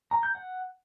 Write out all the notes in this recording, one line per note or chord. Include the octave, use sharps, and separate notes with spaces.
A#5
G6
F#5